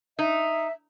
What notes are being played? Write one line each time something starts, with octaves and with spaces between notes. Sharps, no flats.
D#4 E5